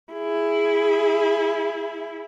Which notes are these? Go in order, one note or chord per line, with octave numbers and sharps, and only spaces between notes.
E4 G#4